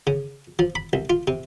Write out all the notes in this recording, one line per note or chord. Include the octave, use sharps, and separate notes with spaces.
C#3
F3
B5
C2
F4
C3